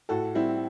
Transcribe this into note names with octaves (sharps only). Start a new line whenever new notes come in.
A2 F#4 A4
G3 C4 E4